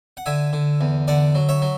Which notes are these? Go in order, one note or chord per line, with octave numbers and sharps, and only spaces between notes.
F#5
D3 E5 G#5
D3
E2
D3 D5 F#5
F#3
C#5 E5
F#3